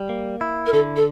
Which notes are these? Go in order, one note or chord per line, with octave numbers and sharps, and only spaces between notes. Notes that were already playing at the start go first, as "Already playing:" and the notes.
Already playing: G3
A#3
E4
A#4
D3 A4
A4